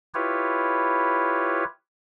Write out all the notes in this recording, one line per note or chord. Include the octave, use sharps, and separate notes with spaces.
E4 F4 G4 B4 C#5